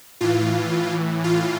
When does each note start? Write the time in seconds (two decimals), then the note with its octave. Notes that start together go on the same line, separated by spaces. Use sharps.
0.21 A2 E3 F4
1.24 F4